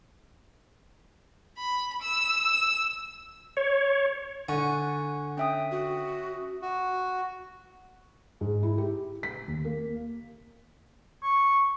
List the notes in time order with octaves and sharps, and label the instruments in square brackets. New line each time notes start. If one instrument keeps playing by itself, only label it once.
[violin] B5
E6
[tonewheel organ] C#5
[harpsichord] D3 [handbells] F#5 G#5 C#6
[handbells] C#4 E5 D#6 [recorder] G5
[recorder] F#4
[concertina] F#4
[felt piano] G#2
E4
G4
B6
D#2
A#3
[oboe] C#6